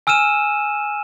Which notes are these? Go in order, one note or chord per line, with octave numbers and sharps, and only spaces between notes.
G#5 E6 F6 D#7 E7